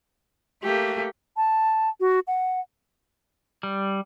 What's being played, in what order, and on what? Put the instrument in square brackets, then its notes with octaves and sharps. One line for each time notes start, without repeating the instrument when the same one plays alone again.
[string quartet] A3 A#3 [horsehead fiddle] G4
[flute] A5
F#4
F#5
[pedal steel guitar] G3